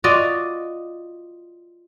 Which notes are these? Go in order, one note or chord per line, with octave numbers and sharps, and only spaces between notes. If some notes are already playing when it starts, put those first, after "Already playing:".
F4 F#4 D5 D#5